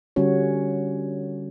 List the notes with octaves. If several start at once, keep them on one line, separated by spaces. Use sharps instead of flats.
D3 G3 C#4 F#4 C#5